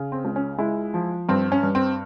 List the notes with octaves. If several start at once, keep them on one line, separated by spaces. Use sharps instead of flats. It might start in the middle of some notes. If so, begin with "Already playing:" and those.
Already playing: C#3
C4
C#2
C#4
G#3 E4
F3
G2 C4
C#4
G2
C4